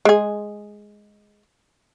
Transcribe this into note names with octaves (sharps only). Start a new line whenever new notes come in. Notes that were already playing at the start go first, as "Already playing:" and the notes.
G#3 G#4